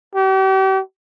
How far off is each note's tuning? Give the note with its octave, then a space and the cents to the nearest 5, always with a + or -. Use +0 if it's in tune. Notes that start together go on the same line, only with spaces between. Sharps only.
G4 -40